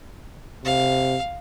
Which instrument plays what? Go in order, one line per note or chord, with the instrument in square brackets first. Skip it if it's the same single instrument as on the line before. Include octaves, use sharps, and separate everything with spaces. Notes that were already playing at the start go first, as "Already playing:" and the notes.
[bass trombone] C3 [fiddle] F5